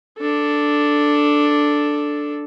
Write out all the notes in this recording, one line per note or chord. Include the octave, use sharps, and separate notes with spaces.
D4 A4